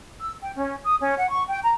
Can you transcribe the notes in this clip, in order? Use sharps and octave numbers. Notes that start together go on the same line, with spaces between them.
E6
G5
C#4
D#6
C#4
F#5
C#6
G5
A#5